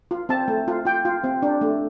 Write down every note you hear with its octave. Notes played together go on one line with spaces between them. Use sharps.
F4
C4 A5
A3
F4
F4 G5
F4
C4
D4
A3